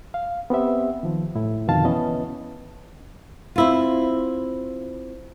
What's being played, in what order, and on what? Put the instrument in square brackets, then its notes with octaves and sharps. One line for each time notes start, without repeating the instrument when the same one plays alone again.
[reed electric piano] F5
B3 C4 G4 E5
D#3 F3
A2 E4
F2 B2 D3 D#3 F5 A5
E3 B3 C#4 B4 D#5
[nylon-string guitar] C4 E4 F4